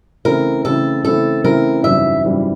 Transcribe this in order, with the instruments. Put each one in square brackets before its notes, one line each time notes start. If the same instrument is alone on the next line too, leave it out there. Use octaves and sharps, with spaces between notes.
[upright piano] C#3 E3 A3 C4 E4 [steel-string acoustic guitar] A#4
[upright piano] C#3 E3 A3 C4 E4 [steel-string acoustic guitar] A4
[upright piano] C#3 E3 A3 C4 E4 [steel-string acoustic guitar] A4
[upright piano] C#3 E3 A3 C4 E4 [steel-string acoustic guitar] A#4
[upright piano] G#1 F#2 C#3 E3 G3 [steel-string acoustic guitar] E5
[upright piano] G#1 F#2 C#3 E3 G3